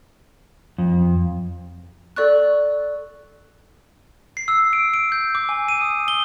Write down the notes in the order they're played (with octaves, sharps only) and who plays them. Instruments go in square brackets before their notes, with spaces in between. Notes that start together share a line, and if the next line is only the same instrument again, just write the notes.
[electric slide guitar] F2
[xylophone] A4 D5 C#6 F#6
[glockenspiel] C7
E6
D7
D7
G6
D6
G#5
D#7
D#6
G7